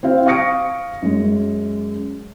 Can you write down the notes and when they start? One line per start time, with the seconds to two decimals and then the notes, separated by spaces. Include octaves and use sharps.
0.03 C4 E4 F5
0.26 F5 C#6 D#6 A#6 C#7 D7
1.02 F#2 G#3